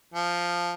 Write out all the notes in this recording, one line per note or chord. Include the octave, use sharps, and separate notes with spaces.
F3